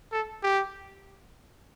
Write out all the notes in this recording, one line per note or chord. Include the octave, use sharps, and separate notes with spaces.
A4
G4